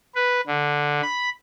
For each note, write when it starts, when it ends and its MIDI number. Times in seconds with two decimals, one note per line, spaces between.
0.15 0.41 71
0.47 1.01 50
1.03 1.29 83